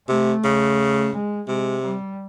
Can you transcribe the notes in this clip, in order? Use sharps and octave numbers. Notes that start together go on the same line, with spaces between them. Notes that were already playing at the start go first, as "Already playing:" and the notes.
C3 A3
C#3
G#3
C3 G#3
G3